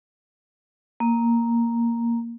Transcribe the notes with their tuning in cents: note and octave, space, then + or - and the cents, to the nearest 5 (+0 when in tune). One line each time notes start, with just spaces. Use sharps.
A#3 +0